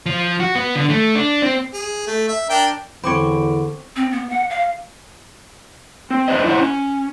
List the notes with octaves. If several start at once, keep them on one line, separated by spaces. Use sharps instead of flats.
F3
F#4
B3
D3
A3
D4
C4
G#4
A3
E5
D4 A#4 G5
E2 D3 C4 C#5 B5 D6 D7
C4
B3
F#5
F5
C4
F2 D4 B4 C5 D#5
E4 C5 D5 F#5
C#4